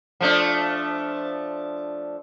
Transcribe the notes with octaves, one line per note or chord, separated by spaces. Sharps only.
F3 A3 D4